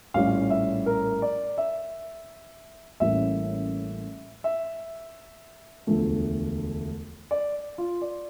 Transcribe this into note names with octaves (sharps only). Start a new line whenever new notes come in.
A#1 A2 G3 C#4 F5
E5
A#4
D5
E5
A1 A2 G3 A#3 C#4 E5
E5
E1 D2 D3 F3 A3
D5
F4
D5